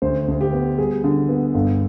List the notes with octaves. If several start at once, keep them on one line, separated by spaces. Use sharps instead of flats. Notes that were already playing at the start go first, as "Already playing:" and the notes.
D2 C5
D2
G4
B3
G3 G#4
D3
B3
G1